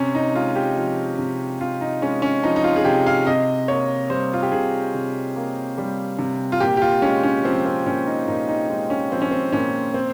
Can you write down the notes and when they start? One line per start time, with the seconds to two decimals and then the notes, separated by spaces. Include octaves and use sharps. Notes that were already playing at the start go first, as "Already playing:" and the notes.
Already playing: C3 C#4
0.15 D#4
0.35 G#3 F4
0.56 G4
0.76 F3
1.19 C3
1.61 C3 F4
1.81 D#4
2.02 G#3 C#4
2.22 C#4
2.43 F3 D#4
2.56 D#4
2.64 F4
2.76 G#4
2.85 C3 G4
3.07 F5
3.27 C3 D#5
3.68 A#3 C#5
4.10 G3 C5
4.33 F4
4.43 G4
4.52 C3 G#4
4.94 C3
5.36 A#3
5.78 G3
6.19 C3
6.52 F4
6.60 A#2 G4
6.77 G4
6.82 F4
7.02 G#3 C#4
7.23 C#4
7.45 F3 C4
7.66 C4
7.86 A#2 C#4
8.07 D#4
8.28 A#2 D#4
8.48 D#4
8.69 G#3 D#4
8.90 C#4
9.11 F3 C4
9.22 C#4
9.31 C4
9.53 A#2 C#4
9.94 C4